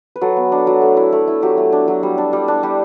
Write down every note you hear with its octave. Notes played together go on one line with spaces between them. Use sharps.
B4
F#3 A4
B3
D4
F#3
A3
E4
A3
E4
F#3 G4
A3
D4
F#3
G3
D4
G3
D4
G3 G4